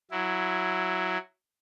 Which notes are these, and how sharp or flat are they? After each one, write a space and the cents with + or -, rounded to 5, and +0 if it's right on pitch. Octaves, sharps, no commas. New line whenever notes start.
F#3 +0 E4 +10